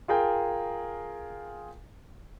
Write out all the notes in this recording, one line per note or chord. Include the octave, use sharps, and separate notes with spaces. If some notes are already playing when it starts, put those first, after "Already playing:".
F4 G#4 A#4 G5